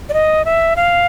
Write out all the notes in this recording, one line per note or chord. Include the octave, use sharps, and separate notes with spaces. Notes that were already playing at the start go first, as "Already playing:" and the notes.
D5
D#5
E5
F5